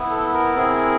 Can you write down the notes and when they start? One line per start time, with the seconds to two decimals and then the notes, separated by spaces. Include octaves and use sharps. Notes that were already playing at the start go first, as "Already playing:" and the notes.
Already playing: B3 E4
0.10 A4
0.33 A#4
0.56 C4 E4 G#4